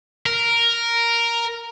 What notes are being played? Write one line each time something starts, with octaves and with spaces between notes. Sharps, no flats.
A#4